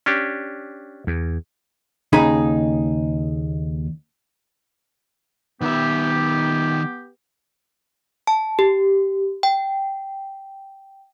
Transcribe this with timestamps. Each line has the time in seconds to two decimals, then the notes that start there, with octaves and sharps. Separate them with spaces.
0.06 C#4 D4 G4
1.07 E2
2.13 D#2 C#3 D#4 G#4 B5
5.62 D#3 B3 G4 E5
8.27 A5
8.59 G4
9.43 G5